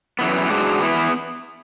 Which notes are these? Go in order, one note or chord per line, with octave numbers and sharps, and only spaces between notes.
F#2 E3 B3
G#2 G#3 D4 F#4
E3 B3 E4